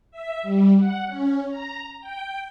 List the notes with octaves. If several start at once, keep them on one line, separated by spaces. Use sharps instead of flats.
E5
G3
F#5
C#4
A#5
G5